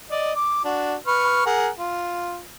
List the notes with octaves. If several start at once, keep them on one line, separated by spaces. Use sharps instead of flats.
D5 D#5
D6
D4 F#4
B4 C#6 F6
G#4 A#4 F#5
F4